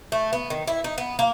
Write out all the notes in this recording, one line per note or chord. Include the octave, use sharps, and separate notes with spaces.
A3
B3
D#3
E4
D#4
B3
A#3